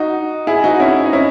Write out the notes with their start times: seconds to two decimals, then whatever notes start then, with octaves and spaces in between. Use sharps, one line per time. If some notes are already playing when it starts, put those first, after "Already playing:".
Already playing: D#4 F#4
0.47 E4 G#4
0.64 D#4 F#4
0.80 C#4 E4
1.06 D#4
1.13 C#4 E4